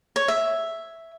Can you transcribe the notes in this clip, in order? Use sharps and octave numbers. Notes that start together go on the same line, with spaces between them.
C#5
E5